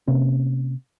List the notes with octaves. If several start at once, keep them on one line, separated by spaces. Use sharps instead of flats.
C3 A#3 C#4